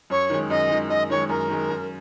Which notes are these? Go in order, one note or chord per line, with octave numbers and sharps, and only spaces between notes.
F#2 C#5
D#3 G#3
F#2 D#5
D#3 G#3
F#2 D#5
D#3 G#3 C#5
F#2 A#4
D#3 G#3
F#2